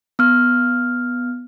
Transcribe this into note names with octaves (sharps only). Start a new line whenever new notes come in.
B3 F6